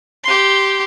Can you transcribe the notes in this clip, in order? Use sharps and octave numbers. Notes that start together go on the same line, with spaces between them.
G4 C6